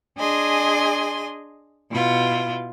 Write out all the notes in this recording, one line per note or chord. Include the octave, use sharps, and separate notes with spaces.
D4 G#4 D#5 G#5 C6
B2 E4 F4